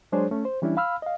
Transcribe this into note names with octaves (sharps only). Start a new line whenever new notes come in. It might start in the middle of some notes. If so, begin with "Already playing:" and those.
F#3 G#3 D4 G#4 C5 C#5
A3 C#4
C5
E3 G3 C#4 D4 E4
F5 B5 E6 F6
D#5 F5